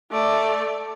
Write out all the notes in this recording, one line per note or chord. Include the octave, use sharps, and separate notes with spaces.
A3 D5